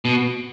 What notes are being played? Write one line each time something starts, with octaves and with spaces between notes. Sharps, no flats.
B2